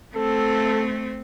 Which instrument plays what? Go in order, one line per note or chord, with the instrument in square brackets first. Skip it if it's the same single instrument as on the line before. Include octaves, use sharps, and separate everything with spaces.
[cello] A3 C4 [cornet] A4